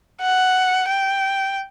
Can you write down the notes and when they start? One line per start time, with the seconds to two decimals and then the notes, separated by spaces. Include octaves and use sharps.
0.22 F#5
0.88 G5